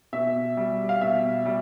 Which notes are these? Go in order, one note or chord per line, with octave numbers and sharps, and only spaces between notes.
B2 E5
G3
F5
B2 E5
G3